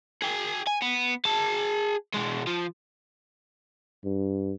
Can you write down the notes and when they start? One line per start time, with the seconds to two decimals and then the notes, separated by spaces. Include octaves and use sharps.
0.22 G#4 G5
0.67 G#5
0.82 B3
1.25 G#4 A5
2.14 B2 G#3
2.47 F3
4.04 G2